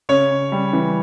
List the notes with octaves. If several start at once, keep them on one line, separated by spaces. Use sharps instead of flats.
C#3 C#5
C#3
G3
E3